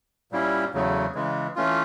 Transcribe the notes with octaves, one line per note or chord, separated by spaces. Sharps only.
A#2 G3 A#3 C#4 E4
E2 C#3 F#3 A3
C#3 E3 G#3
E3 A3 C#4 F4